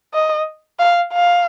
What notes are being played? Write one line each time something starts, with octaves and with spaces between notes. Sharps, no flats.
D#5
F5
F5